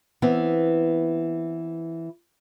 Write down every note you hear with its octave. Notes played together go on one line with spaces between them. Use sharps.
E3 B3 C4